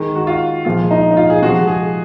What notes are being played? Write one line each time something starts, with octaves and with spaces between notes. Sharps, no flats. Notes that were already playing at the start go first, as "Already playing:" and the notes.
Already playing: D#3 G#3
F#4
F4
A#2 F3 G#3 F4
D#4
D#4
F4
G#4
C3 F3 G#3 F#4
G#4